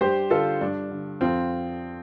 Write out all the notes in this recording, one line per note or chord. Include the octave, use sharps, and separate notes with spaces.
G2 G4 C5
D3 F4 A4
G2 D4
D3
F2 C4 F4